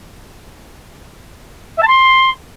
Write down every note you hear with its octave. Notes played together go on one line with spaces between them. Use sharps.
E5
A5
C6